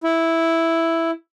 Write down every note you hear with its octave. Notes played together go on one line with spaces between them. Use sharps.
E4